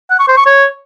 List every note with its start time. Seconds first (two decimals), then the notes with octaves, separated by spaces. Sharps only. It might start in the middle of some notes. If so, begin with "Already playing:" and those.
0.11 F#5
0.19 C#6
0.28 C5
0.37 C#6
0.46 C#5